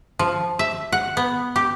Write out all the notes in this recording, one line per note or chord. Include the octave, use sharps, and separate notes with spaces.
F3
E5
F#5
B3
G4